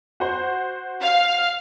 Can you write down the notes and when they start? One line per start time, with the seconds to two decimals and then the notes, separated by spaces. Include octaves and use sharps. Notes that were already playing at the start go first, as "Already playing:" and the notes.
0.20 F#4 C5
1.03 F5